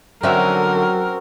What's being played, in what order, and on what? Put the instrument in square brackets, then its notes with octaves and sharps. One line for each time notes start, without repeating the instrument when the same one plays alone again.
[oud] D3 D#4 E5 [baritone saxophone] F#3 [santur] C4 C#4 F#4 [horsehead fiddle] A#4